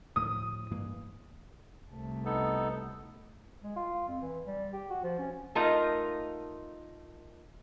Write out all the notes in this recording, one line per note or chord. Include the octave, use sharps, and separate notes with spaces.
D2 A2 F3 D#6
G2 E3 A#3
C2 A3
B3 D#4 A4
G#3
F4
F2
E3
G3
G4
F#4
F3
C#4
A3 D#4 F4 A#4 D#5